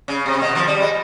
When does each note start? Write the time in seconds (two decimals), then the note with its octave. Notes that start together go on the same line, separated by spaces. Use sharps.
0.08 C#3
0.26 C3
0.42 B2
0.55 F3
0.68 G3
0.81 G#3